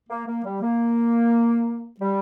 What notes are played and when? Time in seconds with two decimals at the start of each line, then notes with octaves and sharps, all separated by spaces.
0.10 A#3
0.27 A#3
0.44 G3
0.62 A#3
2.01 G3